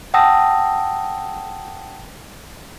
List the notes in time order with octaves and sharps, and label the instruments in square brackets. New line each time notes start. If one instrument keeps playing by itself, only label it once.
[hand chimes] F#5 G5 A5 D#6 E6 A#6